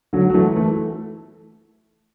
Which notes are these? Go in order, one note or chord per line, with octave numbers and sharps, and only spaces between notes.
D3 F#3
F#3
E3 A3
E3 A3